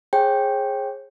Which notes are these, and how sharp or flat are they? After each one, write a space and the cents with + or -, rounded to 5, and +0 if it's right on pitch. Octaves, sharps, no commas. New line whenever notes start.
G#4 +0 C#5 -45 G5 +0